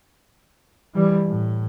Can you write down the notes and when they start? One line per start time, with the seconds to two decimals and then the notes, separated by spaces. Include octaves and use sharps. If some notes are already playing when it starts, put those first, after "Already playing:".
0.95 E3 G3
1.26 A2